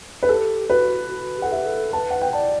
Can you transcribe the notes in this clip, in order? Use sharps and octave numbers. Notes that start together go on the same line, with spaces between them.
B4
G4 A4
F#4 B4
F#4
G4
A4 F#5
G4 E5
A4
B4 A5
F#5
G5
D5 A5